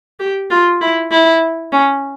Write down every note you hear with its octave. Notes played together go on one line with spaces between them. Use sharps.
G4
F4
E4
E4
C#4